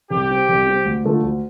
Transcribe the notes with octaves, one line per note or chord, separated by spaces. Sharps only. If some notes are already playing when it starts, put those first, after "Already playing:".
C2 G4
C3 G3 C4
C2
C3 G3 C4
D2
D3 A3 F4
D2